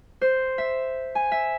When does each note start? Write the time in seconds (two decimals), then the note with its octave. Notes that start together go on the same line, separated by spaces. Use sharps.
0.21 C5
0.58 E5
1.15 G#5
1.32 E5